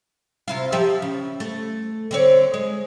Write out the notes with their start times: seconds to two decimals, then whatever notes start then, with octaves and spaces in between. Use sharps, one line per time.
0.48 C3 E4 F4
0.72 F3 G4 E5
1.02 C#3
1.40 A3
2.11 D3 C4 C#5
2.54 G#3